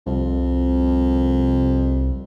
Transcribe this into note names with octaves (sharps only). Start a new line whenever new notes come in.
C2 F2